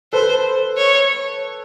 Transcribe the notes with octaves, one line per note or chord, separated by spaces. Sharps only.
A4 B4 C5
C#5